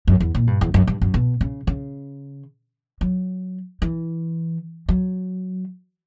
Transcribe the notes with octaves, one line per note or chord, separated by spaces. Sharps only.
F#2
E2
A#2
G2
E2
F#2
G2
F#2
B2
C#3
C#3
F#3
E3
F#3